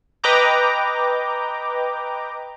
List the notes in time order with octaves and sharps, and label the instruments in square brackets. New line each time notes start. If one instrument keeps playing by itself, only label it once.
[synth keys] B4 D#5 G5 A#5 D6 G6